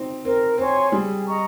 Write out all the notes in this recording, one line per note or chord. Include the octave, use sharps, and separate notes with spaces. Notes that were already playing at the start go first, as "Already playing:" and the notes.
Already playing: C4 D#4
C4 A#4
C4 C#5 G#5 C6
G3 G#4
D#5 A#5 C#6